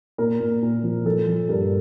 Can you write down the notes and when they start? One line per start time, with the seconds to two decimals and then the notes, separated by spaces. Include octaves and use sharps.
0.18 A#2 A#4
0.40 A#2
0.62 A#2
0.84 F3
1.06 F3 A4
1.27 F3
1.49 G2 A#4